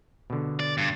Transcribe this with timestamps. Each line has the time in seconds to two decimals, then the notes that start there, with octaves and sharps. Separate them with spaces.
0.30 B2 D3
0.60 D5
0.78 G2